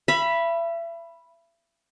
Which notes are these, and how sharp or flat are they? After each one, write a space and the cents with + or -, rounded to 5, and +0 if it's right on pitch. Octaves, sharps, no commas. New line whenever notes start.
E5 +35 B5 -5